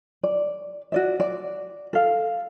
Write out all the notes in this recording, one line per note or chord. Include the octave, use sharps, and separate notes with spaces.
D5
F#4 D5 E5
D5
A4 F5